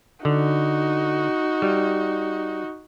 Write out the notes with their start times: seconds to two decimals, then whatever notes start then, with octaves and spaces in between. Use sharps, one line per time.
0.25 D3 D#4 F#4
1.62 G3